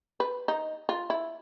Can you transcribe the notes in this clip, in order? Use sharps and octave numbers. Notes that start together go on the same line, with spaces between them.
B4
D#4
F4
E4